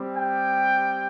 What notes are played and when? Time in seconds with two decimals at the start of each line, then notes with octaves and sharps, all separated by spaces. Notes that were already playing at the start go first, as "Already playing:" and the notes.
Already playing: G3 C4 G4
0.17 G5